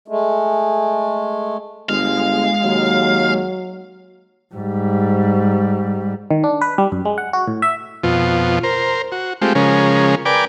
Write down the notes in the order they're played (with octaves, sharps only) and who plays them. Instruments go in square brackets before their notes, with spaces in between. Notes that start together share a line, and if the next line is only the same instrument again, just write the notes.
[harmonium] G#3 A3
[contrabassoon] G1 [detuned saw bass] G#3 [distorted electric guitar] F5
[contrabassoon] D#2 [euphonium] F#3
[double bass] G#2 G3
[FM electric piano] D#3
D4
B4
G3
F#2
G#3
F#5
F#4
A2
E5
[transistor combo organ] F2 B2 F4
A#4 C5
F#4
G#3 A3 C4 F4 G4
C#3 F3 G#3 C#4 A#4
A#4 B4 D5 G5 G#5 D6